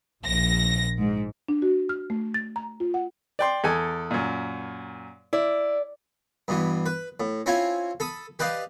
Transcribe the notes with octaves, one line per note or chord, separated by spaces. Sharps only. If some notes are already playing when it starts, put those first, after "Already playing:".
A#1 A#6
G#2
D4
F#4
F6
A3
A6
A#5
F4
F#5
D5 G5 C6
E2 A4 G#5
F#2 A#2
E4 D5
G2 B2 E3
B4
A2
C4 C#4 E4 F4 G#5
A4 B5 D#6
G4 B4 D5 D#5 F5